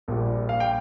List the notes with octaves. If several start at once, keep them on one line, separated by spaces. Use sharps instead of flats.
A#1 A#2 G3
F5
G5